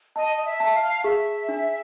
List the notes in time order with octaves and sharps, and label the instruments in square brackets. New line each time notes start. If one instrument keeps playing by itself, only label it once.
[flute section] D#5 [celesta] A5
[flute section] D#5
E5
[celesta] A5
[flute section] F5
[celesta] G#4 [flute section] E5
[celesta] D4